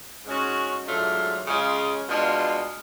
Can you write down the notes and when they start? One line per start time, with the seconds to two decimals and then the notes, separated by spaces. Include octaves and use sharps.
0.24 G#2 G#3 C#4 F#4
0.85 G#2 F#3 A3 D4 F4
1.47 C#3 G#3 C#4 F4
2.08 B2 G#3 D4 F4